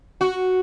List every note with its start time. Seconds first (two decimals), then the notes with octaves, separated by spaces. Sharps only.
0.21 F#4